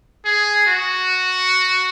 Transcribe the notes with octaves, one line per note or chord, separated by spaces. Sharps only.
G#4
F#4